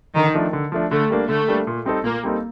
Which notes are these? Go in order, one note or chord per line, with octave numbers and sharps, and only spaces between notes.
D3 D#3
F3 A3 D4
D3
F3 A3 D4
D3 A3
G3 A#3 D4
D3 A3
G3 A#3 D4
A#2
G3 C4 D#4 A4
A#2 A#3
G3 C4 D#4 A4